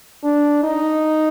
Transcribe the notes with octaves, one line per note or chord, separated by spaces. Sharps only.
D4
D#4